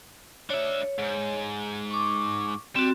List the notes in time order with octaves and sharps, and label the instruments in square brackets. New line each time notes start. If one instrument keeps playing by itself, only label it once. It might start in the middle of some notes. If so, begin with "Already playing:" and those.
[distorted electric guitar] D4 E5 [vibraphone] C#5
[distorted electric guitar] G#2
[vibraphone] C#6 D6
[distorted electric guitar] G3 [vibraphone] C4 F#4